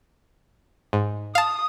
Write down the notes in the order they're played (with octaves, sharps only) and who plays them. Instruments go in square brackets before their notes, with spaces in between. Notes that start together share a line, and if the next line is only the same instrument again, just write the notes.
[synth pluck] G#2
[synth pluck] F5 A5 [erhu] D#6